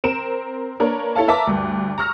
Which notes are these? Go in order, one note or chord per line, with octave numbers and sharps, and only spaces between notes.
C4 A#4 D7 E7
A#3 D4 A#4 B4 C#5
E4 A4 C#5 F5 A5
A#4 B4 E5 A5 A#5 D6
D2 G2
A#5 C#6 E6 F6 A#6